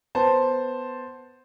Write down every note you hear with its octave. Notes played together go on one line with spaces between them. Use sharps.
B3 C5 A5